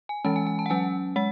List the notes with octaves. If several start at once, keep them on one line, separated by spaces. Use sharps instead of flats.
G#5
E3 G#3 C#4 A5
G#5
G#5
A5
F#5
F#3 C#4 G#5
G#3 F#5